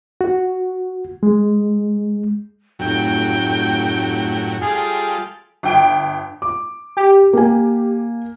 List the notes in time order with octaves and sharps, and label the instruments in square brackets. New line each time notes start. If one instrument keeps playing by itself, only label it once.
[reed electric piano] F#4
G#3
[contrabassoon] F1 [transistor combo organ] F#2 A2 F#3 [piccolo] G5
[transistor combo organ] G3 F4 A4 [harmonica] G#4
[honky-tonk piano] G1 G5 D7
[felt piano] D6
[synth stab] G4
[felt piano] A#3 G#5